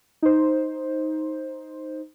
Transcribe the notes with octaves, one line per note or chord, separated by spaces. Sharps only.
D#4 C5